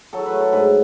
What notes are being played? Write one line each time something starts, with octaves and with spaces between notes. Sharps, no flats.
F#3 A4
B4
A3
A4
G#2 B4